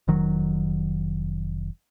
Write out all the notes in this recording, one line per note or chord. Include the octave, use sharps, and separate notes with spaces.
F1 D#3 F#3